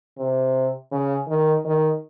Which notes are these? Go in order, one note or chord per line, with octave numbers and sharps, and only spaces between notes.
C3
C#3
D#3
D#3